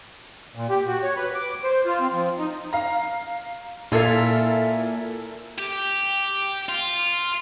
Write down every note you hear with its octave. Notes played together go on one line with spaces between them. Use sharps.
A#2
G4
F#4
C#5
B4
D6
C5
F4
C4
F3
D#4
F5 A#5
A#2 E4 F4 A4 A#4 E5 F5 G#5
G4
F4